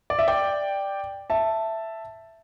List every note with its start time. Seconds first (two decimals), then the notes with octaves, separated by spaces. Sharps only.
0.10 D5
0.19 E5
0.28 D5 G5
1.30 E5 A5